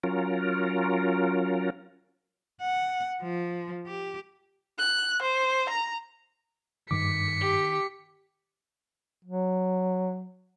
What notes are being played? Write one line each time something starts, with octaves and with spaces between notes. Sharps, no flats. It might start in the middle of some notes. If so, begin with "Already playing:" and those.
F#3 C#4 F4 A#4
F#5
F3
G4
F#6
C5
A#5
G2 D#3 D6 B6 C#7
G4
F#3